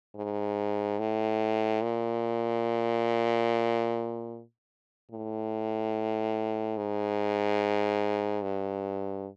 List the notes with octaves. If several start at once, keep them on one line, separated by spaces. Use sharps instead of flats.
G#2
A2
A#2
A2
G#2
G2